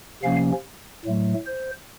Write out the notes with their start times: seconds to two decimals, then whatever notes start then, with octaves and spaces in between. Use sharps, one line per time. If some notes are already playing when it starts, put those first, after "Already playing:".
0.23 C3 F3 A#3 C#4 F5
1.05 A2 F#3 A3
1.46 C5